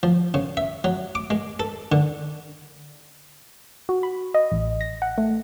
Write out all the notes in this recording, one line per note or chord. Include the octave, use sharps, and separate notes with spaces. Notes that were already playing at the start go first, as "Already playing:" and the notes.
F3
C#3
E5
F#3
D6
G#3
A4
D3
F#4
B5
D#5
A1
A#6
F#5
A3